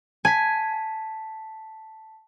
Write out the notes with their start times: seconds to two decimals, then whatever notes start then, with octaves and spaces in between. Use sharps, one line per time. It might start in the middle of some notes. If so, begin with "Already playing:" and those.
0.25 G#5 A5 B6